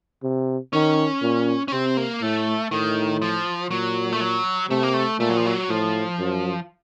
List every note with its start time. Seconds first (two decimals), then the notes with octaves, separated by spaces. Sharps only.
0.23 C3
0.73 D#3 C#4
1.22 A#2
1.68 C#4
1.72 C3 C4
1.97 A#3
2.22 A2 A3
2.71 A2 D#3
3.22 F3
3.71 A#2 F#3
4.13 A3
4.21 F#3
4.70 C3 A3
4.83 A#3
4.94 A3
5.20 A#2 A3
5.29 F#3
5.37 F3
5.46 F#3
5.69 A2 F3
6.19 F#2